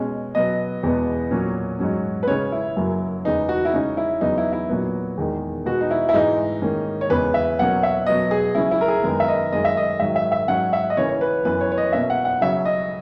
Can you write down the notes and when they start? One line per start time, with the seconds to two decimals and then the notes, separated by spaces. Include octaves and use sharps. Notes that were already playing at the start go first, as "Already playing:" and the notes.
Already playing: B2 G#3 C#4
0.35 B2 F#3 B3 D#5
0.83 E2 B2 G#3 B3
1.31 A#2 F#3 C#4
1.80 G#2 F#3 C#4
2.23 B4
2.27 C#3 G#3 C#4 C#5
2.52 E4
2.76 F#2 C#3 F#3 A#3
3.25 E2 C#3 G#3 B3 D#4
3.49 F#4
3.65 E4
3.73 C#3 G#3 C#4 D#4
3.97 E4
4.21 E2 C#3 F#3 B3 D#4
4.38 E4
4.53 E4
4.69 A#2 F#3 B3
5.17 E2 D#3 G#3
5.66 B2 G#3 B3 F#4
5.81 D#4
5.91 E4
6.09 E4
6.13 G#2 E3 G#3 D#4
6.62 G#2 D#3 A#3 C#4
7.01 C#5
7.10 E2 C#3 G#3 B3 B4
7.34 E5
7.59 B2 F#3 A#3 C#4 F#5
7.83 E5
8.07 B2 F#3 B3 D#5
8.31 G#4
8.55 C#3 F#3 C#4 E4
8.71 E4
8.81 A#4
8.88 G#4
9.03 F#2 D#3 G#3 B3 A#4
9.20 E5
9.28 D#5
9.52 F#2 D#3 G#3 C#4 D#5
9.65 E5
9.77 D#5
10.00 G#2 D#3 F#3 E5
10.16 E5
10.32 E5
10.48 G#2 F#3 C#4 F#5
10.73 E5
10.90 D#5
10.97 C#3 E3 A#3 C#4 C#5
11.09 C#5
11.21 B4
11.45 F#2 E3 B3 B4
11.61 C#5
11.72 C#5
11.78 D#5
11.93 B2 A#3 C#4 E5
12.10 F#5
12.25 F#5
12.41 C#3 F#3 C#4 E5
12.65 D#5